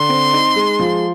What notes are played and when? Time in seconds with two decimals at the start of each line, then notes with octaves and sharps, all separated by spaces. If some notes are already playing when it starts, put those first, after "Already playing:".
Already playing: D3 C6
0.09 C4
0.33 D#4
0.56 G#3
0.79 F3